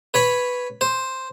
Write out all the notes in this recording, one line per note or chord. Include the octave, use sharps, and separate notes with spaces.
B4 C#5 B5
C5